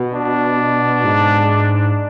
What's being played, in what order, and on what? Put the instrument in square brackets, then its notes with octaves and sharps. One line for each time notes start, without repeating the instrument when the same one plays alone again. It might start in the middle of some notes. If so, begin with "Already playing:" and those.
Already playing: [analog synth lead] B2
[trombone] D4
[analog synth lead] G#2